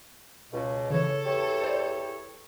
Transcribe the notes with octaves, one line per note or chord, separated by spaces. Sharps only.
C#2 B2
C#3 E3 A4 C#5
E2 G4 C#5
C5 D5